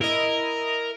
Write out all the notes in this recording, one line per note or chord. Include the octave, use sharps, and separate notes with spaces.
E4 A#4 D#5